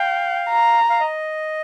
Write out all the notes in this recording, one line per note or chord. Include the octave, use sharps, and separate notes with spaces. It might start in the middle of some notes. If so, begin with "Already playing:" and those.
Already playing: F5 G5
A#5
F5
D#5